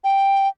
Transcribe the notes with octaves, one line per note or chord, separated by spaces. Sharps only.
G5